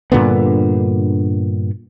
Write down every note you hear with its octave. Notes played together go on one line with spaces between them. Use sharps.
G2 A#2 D3 B3